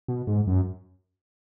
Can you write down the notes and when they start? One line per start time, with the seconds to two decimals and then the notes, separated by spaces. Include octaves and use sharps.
0.08 B2
0.27 G#2
0.47 F#2